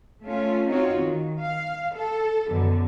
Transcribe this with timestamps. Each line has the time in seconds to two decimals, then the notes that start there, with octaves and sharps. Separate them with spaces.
0.24 A3 C#4 F4
0.68 C4 D#4 F4 F#4 C#5
0.97 D#3
1.40 F5
1.95 A4
2.48 F#2 B2 D3